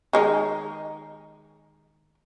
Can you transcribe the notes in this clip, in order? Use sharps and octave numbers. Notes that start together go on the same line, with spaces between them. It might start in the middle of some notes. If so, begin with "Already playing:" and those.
D#3 G#3 D#4